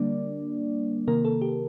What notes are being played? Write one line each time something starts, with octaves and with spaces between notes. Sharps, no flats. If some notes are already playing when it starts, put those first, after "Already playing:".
Already playing: D3 G3 A#3 D4 D5
C3 D#3 A#3 A#4
A4
G4